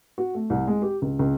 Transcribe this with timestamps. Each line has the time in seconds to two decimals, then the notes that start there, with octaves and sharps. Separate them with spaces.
0.18 F#4
0.35 A3
0.50 C2
0.67 G#3
0.82 G4
1.02 C#2
1.19 C#2